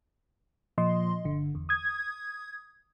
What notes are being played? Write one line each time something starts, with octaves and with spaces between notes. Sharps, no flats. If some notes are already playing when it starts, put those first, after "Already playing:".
A#2 F3 D#5 C6
G1 D3
E2
D#6 G#6